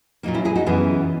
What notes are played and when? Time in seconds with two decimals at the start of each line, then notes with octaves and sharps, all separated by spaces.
0.23 A#2 F#3 A#3 D#4
0.34 C#4 E4
0.45 E4 G#4
0.55 D#4 F#4
0.66 F#2 E3 B3 E4 G#4